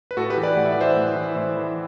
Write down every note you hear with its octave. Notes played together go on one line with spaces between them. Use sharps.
B4
A2 F#4 A4
G4 B4
E3
B4 D5
A2 F#5
E5
D5
E3 C5 E5
A2
E3
A2 C5 E5
E3